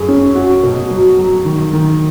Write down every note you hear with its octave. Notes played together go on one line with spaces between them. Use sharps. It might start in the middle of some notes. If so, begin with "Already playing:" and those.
Already playing: F#2 G#4
C#4
F#4
B2
F#3
F#3
D#3
D#3